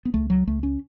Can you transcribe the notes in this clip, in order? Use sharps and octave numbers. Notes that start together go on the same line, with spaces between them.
B3
C#2 A3
F#3
C#2 A3
C#4